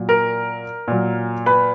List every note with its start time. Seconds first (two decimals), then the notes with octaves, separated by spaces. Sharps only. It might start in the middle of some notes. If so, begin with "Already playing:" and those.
Already playing: A#2 F#3
0.09 A#4 A#5
0.88 A#2 F#3
1.46 B4 B5